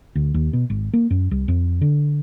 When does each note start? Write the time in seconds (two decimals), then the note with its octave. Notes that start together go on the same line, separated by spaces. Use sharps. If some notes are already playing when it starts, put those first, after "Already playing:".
0.15 D2
0.34 D#2
0.53 B2
0.70 G#1
0.93 A#3
1.11 F#2
1.31 C2
1.48 F2
1.81 D3